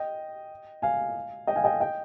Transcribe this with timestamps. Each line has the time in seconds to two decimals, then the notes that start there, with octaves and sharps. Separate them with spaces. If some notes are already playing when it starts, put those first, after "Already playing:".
Already playing: D#5 G5
0.82 F5 G#5
1.47 D#5 G5
1.56 F5 G#5
1.64 D#5 G5
1.80 D#5 G5